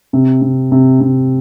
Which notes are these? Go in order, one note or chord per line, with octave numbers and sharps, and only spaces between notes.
C3
C3
C3
C3